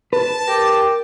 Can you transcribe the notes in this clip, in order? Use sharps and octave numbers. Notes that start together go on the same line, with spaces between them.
B4 A5
G4 A#4 G5